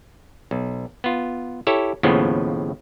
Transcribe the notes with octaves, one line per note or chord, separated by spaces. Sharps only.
B1
B3 F4
E4 G4 A4 C#5
D#2 A2 C#3 F3 B3